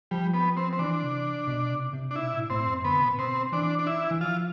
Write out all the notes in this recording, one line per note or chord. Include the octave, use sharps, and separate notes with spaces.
F3 G3
B3
C4
C4
E3 D4
C3
B2
C3
C3
D4
B2 E4
A2
A2 C4
F2
D3 B3
B2
A2
B2 C4
E3 D4
D4
E4
E3
F3 F4